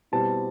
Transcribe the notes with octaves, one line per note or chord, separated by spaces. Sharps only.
B2 G3 C4 E4 A5